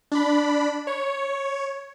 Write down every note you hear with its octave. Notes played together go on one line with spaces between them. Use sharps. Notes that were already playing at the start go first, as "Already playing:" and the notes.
D4 B5
C#5